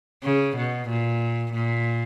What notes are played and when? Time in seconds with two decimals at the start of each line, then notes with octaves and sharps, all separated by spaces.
0.23 C#3
0.57 B2
0.89 A#2
1.54 A#2